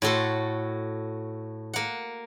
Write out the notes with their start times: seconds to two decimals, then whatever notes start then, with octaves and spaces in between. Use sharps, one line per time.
0.02 A2 F#4 A4 C6
1.73 A#3 F#5